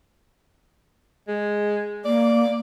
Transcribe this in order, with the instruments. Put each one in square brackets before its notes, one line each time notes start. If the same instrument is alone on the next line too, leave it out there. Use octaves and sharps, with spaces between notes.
[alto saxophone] G#3
[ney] A#3 [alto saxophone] D5